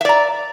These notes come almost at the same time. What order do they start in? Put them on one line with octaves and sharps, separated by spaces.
E5 D5 A#5